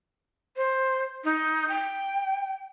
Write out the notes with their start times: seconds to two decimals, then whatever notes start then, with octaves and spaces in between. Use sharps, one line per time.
0.56 C5
1.24 D#4
1.69 G5